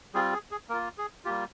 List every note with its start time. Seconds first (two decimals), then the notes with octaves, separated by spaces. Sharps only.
0.14 G3 C4 F4 G#4
0.33 G#4
0.51 G#4
0.69 A#3 A#4
0.73 F4
0.98 G#4
1.25 G3 A#3 F4 G4